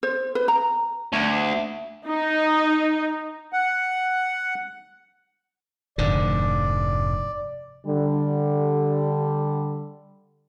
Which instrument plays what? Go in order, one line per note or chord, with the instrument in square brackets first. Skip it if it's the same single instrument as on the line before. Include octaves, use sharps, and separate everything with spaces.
[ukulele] C5
B4
A#5
[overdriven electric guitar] D2
[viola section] D#4
[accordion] F#5
[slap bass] F1 G#2 D3 [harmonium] D5
[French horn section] D3 G3